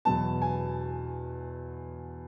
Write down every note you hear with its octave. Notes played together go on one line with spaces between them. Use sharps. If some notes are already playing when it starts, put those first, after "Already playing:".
E2 B2 F#3 B3 A5
G#5